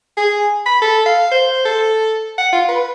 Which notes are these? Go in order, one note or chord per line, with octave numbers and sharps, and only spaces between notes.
G#4
B5
A4
F5
C5
A4
F#5
F4
B4